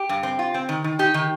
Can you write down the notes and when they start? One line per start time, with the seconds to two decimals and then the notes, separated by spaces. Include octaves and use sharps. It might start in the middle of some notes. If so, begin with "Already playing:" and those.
Already playing: G4
0.09 G2
0.23 C4
0.39 F4
0.54 C4
0.69 D#3
0.84 D#3
0.99 D#4 G4
1.14 D#3